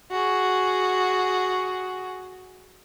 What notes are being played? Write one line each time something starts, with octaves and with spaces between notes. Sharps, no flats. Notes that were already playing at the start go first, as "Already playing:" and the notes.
F#4 G#4